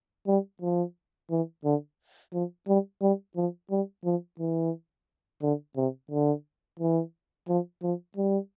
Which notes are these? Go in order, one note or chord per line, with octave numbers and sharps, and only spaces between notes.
G3
F3
E3
D3
F3
G3
G3
F3
G3
F3
E3
D3
C3
D3
E3
F3
F3
G3